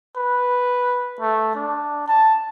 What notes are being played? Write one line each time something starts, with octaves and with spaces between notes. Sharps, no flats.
B4
A3
D4
A5